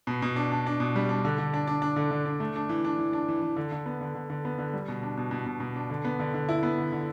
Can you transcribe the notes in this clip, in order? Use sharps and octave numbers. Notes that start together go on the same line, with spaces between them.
B2
B2
D4
D4
D4
B2
G3
D4
D3
D3
D4
D4
D4
D3
D3
D4
A3
D4
E3
D4
E3
D4
E3
E3
D3
D3
B3
D3
D3
D3
B3
D3
G3
B2
D4
B2
B2
B2
B2
D4
D3
B3
D3
D3
E4
B3
D3
D3